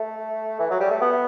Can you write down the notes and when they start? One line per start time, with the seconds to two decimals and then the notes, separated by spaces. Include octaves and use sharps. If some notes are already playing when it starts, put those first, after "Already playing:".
Already playing: A3
0.60 E3
0.71 F#3
0.81 G3
0.91 A3
1.02 B3